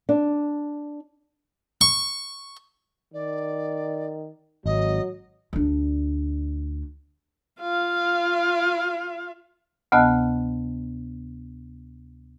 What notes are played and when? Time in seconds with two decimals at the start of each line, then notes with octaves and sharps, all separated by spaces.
0.09 D4
1.81 C#6
3.14 D#3 D5
4.66 G#1 F#3 D#5
5.53 D2 D4
7.61 F4 F5
9.92 D2 C3 B3 D#5 A5 F#6